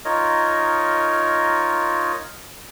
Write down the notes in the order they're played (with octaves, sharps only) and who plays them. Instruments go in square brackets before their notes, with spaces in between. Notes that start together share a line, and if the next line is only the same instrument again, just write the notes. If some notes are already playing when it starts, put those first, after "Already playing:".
[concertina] D#4 F4 A#4 C#5 D#5